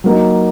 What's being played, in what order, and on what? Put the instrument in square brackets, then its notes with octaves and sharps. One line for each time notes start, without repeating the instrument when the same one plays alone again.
[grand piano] F#3 A#3 D#4